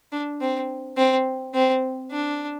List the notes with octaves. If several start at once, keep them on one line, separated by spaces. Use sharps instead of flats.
D4
C4
C4
C4
D4